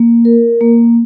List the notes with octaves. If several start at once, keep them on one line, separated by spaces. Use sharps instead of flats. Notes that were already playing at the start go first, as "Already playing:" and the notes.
Already playing: A#3
A#4
A#3